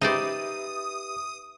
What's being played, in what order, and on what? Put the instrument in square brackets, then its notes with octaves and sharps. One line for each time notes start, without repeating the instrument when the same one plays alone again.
[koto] D#4 C5 D5 [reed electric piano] G4 B4 E5 [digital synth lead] D#6